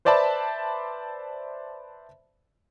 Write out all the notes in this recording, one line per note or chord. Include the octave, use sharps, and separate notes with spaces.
B4 C5 D5 E5 A5 B5